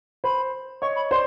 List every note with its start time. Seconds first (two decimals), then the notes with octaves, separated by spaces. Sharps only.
0.24 C5 B5
0.82 C#5 D#5 C#6
0.96 B5
1.11 C5 D5 C6